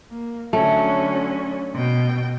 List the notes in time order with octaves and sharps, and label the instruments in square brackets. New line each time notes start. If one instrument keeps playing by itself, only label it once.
[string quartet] A#3
[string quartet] D3 F#3 C#4 [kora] A3
[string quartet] B2 G5